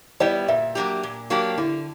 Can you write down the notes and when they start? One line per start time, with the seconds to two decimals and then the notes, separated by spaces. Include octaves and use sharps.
0.20 G3 B3 E4 G4 D5
0.48 A#2 E5
0.75 F#3 A#3 D4 G4
1.03 A#2
1.30 F#3 A#3 D4 G4
1.58 D3 E4